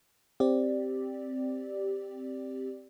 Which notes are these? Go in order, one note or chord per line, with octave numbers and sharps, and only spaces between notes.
C4 G4 D5